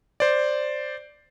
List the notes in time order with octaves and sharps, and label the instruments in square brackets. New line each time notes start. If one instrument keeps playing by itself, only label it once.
[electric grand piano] C5 D5